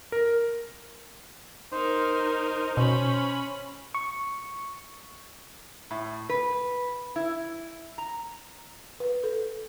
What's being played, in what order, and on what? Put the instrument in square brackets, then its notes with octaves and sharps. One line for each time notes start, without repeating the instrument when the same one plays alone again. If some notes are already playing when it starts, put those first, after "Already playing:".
[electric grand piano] A#4
[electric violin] D#4 A#4 [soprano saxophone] C5
[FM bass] B2 [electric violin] C#4 B5
[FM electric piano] C#6
[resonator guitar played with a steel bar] A2
B4
E4
A#5
[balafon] B4
A4